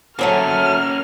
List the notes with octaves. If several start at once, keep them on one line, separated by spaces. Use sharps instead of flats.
F#2 F#3 A3 A#3 C#4 F6